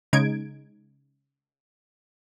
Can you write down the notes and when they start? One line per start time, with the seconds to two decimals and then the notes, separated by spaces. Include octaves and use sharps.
0.13 C#3 G#3 D#4 G#6 D7